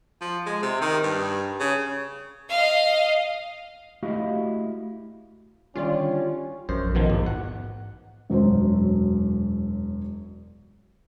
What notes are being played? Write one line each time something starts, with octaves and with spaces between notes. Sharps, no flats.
F3
G#3
C3
D#3
G2
C#3
D#5 F5
A3 E4 F#4 G4 D#5 F5
D3 D#3 G3 C#4 F4 G4 D5
A#1 F#2 C5
B2 D#3 F3
E2 G#2
F#5
E1 F#2 F#3 C5